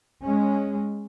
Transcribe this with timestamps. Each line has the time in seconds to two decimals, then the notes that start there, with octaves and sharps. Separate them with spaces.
0.24 G#3 C#4